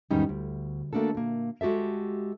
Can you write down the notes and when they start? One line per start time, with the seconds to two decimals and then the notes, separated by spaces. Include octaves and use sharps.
0.11 E2 G#2 D#3 G3 C#4 D#4
0.29 D2
0.93 A3 A#3 D4 F#4 A4
1.15 A#2 A#3
1.61 G#3 F#4 G4 A4 E5